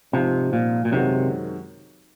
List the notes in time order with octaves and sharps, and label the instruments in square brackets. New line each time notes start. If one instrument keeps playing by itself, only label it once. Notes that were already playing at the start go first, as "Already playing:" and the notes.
[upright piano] G#2 F3 C4 F4 [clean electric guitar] C3
[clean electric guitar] A#2
A#2
[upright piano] F#2 D#3 G#3 C4 F#4 [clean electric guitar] C3